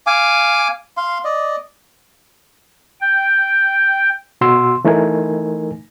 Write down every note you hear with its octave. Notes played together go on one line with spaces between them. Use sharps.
F5 G#5 D6
F5 C6
D5 D#5
G5
B2 F#4 C6 E6
E3 A3 D#4 A#4 G#5